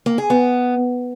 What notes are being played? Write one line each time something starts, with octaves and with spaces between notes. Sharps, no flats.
A#3
G#4
B3